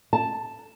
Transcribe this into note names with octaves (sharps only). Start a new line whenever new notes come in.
A5